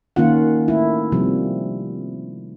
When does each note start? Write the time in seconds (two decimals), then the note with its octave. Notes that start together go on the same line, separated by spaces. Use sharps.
0.16 D#3 A#3 C#4 F4 F#5
0.68 A3 E4
1.12 C3 F3 G3